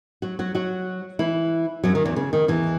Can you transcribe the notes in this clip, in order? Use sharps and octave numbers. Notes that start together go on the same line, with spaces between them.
F#3 F#4
F#3 F#4
F#3 F#4
E3 E4
F#2 F#3
D#3
E2 E3
C#3
D#3
E2 E3